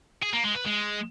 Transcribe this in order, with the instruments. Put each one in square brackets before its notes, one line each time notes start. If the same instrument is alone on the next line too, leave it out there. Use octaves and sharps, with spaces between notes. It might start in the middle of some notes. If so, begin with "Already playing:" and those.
[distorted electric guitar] G#4
A#3
G#3
B4
G#3